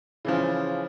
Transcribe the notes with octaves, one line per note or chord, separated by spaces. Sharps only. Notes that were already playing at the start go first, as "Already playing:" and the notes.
C#3 E3 F3